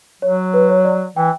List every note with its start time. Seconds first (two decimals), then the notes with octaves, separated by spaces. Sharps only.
0.22 F#3 C#5
0.54 B4
0.69 C#5
0.85 D5
1.16 E3 G5